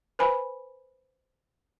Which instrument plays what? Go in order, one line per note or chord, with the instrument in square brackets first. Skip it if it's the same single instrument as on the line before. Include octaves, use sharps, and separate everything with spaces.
[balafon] B4 C5 G#5 B5